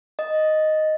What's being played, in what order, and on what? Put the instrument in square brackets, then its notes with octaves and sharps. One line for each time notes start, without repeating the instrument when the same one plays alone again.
[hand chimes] D#5